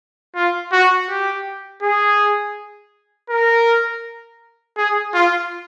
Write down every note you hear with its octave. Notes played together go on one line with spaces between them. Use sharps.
F4
F#4
G4
G#4
A#4
G#4
F4